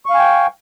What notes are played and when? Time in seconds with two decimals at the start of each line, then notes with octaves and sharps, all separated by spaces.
0.06 C#6
0.10 F5
0.14 G#5
0.19 G5